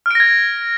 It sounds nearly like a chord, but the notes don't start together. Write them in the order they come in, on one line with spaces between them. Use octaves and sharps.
F6 D7 A#6 G#6